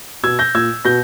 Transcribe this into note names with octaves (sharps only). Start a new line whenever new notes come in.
B2 E6 G#6
G6 A#6
A#2 E6 G#6
B2 G6 A#6